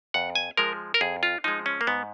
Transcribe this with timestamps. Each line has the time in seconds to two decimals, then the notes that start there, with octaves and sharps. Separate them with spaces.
0.14 F2 F#5
0.35 G#5
0.57 F3 G#3 A#4
0.94 A#4
1.01 F2 G#4
1.23 F4
1.44 F3 G#3 D#4
1.66 C#4
1.81 A#3
1.87 G#2 B3